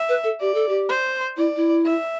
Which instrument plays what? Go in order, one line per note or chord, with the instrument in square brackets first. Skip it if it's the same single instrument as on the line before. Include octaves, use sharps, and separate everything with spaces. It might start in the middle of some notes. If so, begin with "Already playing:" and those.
Already playing: [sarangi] E5
[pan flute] B4
A4
[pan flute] G4 [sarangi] D5
[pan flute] A4
G4
[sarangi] C5
[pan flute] E4 [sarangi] D5
[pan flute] E4
[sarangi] E5